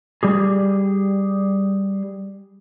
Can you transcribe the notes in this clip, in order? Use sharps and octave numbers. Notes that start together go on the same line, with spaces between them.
G3 G4 G#4